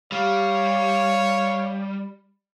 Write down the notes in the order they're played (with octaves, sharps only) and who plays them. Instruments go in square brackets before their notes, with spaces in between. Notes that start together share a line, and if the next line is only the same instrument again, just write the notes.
[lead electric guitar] G3 [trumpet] C#5 [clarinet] F5